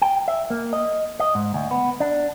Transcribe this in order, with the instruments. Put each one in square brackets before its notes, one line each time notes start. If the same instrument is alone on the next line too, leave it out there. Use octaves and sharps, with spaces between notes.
[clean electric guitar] G5
E5
A#3
D#5
D#5
G#2
D2
B3
D4